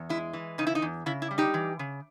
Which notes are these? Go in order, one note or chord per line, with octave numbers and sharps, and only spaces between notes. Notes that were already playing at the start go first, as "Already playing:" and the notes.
Already playing: E2
G#3 E4
E3
C#3 D#4
E4
D#4
E2
C#3 E4
E4
G3
D#4 G4
E3
C#3